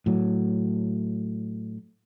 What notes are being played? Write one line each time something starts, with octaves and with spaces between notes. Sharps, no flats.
A2 F#3